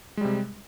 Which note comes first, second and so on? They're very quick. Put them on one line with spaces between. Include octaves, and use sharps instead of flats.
G#3 G3 C3